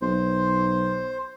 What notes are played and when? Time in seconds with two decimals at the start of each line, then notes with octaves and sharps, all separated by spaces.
0.02 B1 C5